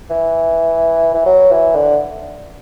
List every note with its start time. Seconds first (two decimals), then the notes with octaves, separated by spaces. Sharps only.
0.10 E3
1.14 E3
1.26 F#3
1.51 E3
1.75 D3